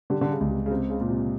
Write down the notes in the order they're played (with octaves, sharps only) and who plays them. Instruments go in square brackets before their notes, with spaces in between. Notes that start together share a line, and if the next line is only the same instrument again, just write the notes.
[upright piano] D3 [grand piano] G3
[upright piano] D3
C#3
[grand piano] C#2
[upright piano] C3
C#3
[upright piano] C3 [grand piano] C4
[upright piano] C#3
[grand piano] A#2
[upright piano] C3